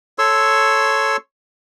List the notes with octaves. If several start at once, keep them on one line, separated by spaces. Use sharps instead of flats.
A4 C#5 C6 C#6 E6